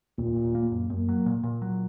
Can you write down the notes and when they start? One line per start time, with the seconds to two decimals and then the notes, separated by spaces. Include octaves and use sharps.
0.18 D#2 A#2
0.36 D#2
0.55 A#3
0.72 F#2
0.90 F#2 A#3
1.09 F#3
1.26 A#2
1.43 A#2
1.62 F#3